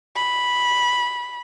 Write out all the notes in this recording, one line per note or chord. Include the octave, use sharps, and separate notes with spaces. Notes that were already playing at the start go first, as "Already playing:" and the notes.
B5